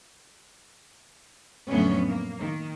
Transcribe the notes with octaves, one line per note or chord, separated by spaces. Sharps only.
F2 A2 D3 F#3 B3 C#4
A#3
D#3